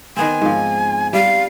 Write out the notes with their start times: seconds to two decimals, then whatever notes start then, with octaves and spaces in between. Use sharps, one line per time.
0.16 D#3 B3 C4 G#5
0.42 G#2 F3
1.13 G3 F5